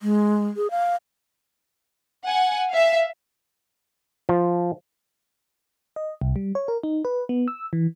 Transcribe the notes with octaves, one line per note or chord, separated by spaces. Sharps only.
G#3
G#4
F5
F#5 G#5
E5 F5
F3
D#5
C2
G3
C#5
A#4
D#4
B4
B3
E6
E3